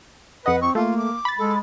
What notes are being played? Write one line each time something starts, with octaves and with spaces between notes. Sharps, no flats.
F2 B4 D#5 F#5
C4 C#6
A3 A#3 F4
D6
B5 A6
G#3 A4